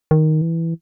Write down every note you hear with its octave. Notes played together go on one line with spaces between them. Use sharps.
D#3
E3